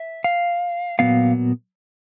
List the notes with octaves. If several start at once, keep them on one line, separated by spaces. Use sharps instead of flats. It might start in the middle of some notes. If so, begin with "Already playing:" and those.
Already playing: E5
F5
A#2 F#3 B3 F5